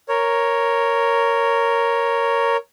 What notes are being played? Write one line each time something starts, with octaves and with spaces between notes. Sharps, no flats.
A#4 C#5